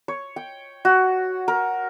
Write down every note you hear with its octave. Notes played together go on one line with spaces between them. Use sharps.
C#5
G5
F#4
A#4